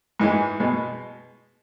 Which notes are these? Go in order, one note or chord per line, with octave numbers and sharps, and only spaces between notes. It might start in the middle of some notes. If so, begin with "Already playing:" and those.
G#2 E3 G#3
B2 G#3